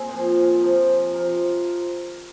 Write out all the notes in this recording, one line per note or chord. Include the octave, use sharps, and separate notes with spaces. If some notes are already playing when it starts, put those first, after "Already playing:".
Already playing: A#3 C4 G#4
A#2 F3
C3 F3
C3 F3 A#4